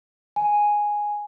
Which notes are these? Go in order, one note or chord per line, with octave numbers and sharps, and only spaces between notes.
G#5